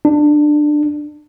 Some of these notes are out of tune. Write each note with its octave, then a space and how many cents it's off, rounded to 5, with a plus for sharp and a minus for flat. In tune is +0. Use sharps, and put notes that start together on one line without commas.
D4 +20